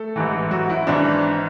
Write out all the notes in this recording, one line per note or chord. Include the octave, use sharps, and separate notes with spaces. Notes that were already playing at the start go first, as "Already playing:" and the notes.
Already playing: A3 A4
A1 G#2 E3
F#3 F#4
E4
G#1 G#2 E3 D4